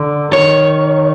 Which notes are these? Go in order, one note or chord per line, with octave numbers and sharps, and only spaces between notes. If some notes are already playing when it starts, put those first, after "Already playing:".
Already playing: D3
D#3 C#5